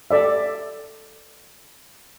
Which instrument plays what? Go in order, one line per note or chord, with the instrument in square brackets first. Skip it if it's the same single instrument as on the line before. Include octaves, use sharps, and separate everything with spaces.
[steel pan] A4 D5 E5